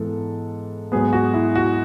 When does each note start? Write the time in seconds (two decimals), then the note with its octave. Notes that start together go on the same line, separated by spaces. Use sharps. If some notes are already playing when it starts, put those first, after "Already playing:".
Already playing: G#2 E3 B3 A4
0.92 G#2 F#3 B3 G#4
1.13 F#4
1.34 E4
1.55 F#4